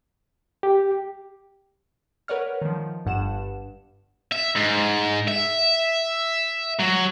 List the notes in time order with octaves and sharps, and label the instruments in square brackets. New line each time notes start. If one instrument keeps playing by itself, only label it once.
[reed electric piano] G4
[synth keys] A#4 B4 C#5 D5 F#5 F6
D#3 F3
G1 G2 F#5 E7
[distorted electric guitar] E5
G#2
E5
F#3